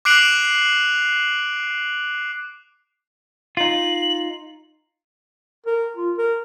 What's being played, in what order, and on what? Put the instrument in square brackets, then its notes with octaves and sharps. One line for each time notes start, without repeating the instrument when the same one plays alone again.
[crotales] D6 F#6 C7 D7 F7 F#7
[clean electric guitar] D#4 F4 [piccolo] F#7
[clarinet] A#4
F4
A#4